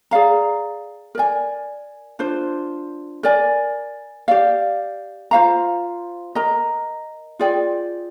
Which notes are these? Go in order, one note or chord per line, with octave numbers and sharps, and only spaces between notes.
G#4 D5 F5 A#5
A#4 D5 G#5
D4 F4 C5
A#4 D5 G#5
G4 D5 F5
F4 C5 F5 A#5
A#4 D#5 A#5
F4 G#4 D5 G5